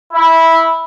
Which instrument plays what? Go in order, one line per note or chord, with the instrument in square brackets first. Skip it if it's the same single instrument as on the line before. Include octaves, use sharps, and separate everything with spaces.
[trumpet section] E4